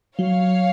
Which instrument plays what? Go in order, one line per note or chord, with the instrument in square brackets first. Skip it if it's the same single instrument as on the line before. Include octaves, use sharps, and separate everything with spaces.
[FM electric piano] F#3 [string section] C#5 F5